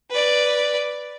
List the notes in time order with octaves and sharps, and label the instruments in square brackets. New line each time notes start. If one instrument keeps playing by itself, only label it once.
[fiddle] B4 D5